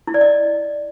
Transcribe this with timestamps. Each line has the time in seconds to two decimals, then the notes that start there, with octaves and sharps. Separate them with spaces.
0.07 E4
0.14 D5
0.21 D#5